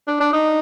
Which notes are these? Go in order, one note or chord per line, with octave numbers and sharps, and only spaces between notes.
D4
D4
D#4